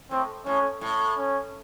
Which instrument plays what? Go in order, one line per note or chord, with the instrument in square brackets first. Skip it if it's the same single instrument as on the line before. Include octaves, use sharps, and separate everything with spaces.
[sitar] A2 [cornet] C4
[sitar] A2 [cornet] C#4
[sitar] A2
[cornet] C#4